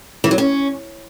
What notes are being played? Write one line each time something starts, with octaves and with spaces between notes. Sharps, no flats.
E3
F#3
C#4